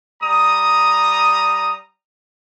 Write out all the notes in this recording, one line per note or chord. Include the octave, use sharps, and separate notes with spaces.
G3 A#5 D#6